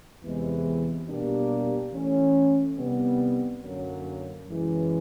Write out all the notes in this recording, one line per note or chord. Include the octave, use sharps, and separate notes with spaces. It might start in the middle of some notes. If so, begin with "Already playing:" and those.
E2 C3 E3 G#3
B2 G3 A#3 D4 G4
E3 A3 C#4
C3 D#3 G3 B3
F#2 D3 F#3 A#3 C#4
F#2 C#3 E3 G#3